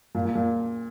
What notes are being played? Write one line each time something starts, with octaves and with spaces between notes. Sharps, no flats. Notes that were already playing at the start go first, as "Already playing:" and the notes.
A#2
A#2
A#2